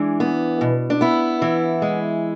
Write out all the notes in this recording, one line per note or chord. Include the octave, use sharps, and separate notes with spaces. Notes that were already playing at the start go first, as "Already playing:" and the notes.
Already playing: E3 G#3 D4
B3
B2
D4
B3 E4
E3
G#3